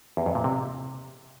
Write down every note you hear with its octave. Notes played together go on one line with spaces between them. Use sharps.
E2
F2
A#2
C3